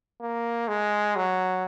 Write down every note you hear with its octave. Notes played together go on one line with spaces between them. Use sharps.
A#3
G#3
F#3